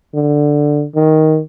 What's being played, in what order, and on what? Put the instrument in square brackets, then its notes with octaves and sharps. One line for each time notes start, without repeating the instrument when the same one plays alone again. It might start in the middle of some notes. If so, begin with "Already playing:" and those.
[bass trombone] D3
D#3